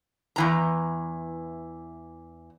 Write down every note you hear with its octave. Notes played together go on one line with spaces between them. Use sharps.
E2 E3 A#5